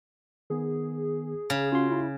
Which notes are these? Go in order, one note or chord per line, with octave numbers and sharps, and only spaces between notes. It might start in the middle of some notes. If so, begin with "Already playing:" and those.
D#3 B3 G#4
C#3
C#4 F4 F#4 C6
E4